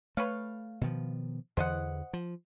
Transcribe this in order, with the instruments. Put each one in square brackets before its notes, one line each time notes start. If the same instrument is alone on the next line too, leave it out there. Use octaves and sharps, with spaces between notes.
[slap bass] A3 [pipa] B4 C#5 F5
[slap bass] B2 D#3 F3
[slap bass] E2 D3 E3 [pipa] C5 D#5 F#5
[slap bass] F3